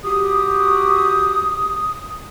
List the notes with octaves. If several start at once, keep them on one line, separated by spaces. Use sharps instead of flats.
F#4 G4 D#6